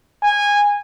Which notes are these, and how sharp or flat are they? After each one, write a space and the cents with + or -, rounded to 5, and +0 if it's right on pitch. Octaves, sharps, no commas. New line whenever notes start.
G#5 -15